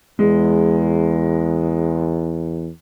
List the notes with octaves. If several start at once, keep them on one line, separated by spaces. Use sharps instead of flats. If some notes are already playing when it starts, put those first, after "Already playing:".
E2 G#3